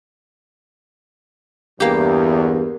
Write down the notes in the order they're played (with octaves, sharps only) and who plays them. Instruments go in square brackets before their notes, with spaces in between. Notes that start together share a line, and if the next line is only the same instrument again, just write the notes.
[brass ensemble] E2 G2 [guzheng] A#3 G4